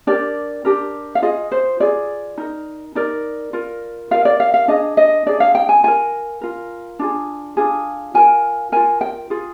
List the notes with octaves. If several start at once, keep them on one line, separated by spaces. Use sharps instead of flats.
D4 G4 A#4 D5
D4 G4 A#4
F5
F4 G#4 D#5
C5
F4 G#4 D5
D#4 A#4
D#4 A#4 D5
F4 A#4
F4 A#4 F5
D5
F5
F5
D4 G#4 D#5
D#5
D4 G#4 D5
F5
G5
G#5
F4 A#4 G#5
F4 A#4
D4 F4 G#4
D4 F4 G#4
F4 A#4 G#5
F4 A#4 G#5
G5
F4 G#4